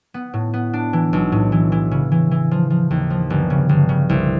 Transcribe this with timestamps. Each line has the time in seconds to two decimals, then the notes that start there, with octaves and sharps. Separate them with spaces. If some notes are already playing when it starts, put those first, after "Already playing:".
0.14 B3
0.33 A2
0.54 B3
0.73 D4
0.93 E3
1.13 B1
1.32 A2
1.52 E3
1.72 E3
1.91 C#3
2.12 E3
2.31 E3
2.51 F3
2.70 F3
2.90 D#2
3.10 F3
3.30 G1
3.50 C#3
3.69 G1
3.89 C#3
4.09 C2